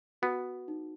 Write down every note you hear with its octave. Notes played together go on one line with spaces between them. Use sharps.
B3 F#4
D#4